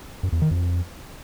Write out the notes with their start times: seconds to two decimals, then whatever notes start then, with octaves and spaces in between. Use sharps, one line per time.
0.23 F#2
0.32 E2
0.42 D#3
0.51 F2